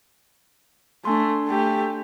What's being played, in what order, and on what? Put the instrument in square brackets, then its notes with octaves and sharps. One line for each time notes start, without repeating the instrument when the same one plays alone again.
[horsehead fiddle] A3 [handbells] D4 G#5 C6
[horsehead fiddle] A3 G4